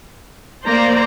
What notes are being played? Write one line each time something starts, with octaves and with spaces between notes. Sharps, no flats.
A#3 C5 D5 A#5